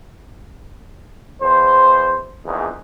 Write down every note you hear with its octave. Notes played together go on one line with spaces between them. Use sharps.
E2 C5
A#1 E2 G#2